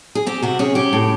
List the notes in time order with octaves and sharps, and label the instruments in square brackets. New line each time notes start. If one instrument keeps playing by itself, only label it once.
[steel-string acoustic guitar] G#4
C4 G4
C3 F#4
C#4 G#4
C#4 G4
A2